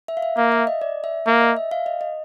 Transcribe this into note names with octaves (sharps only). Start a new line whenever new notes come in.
E5
F5
E5
A#3 F5
E5
D#5
D5
E5
A#3 E5
D#5
E5
F5
D#5
D#5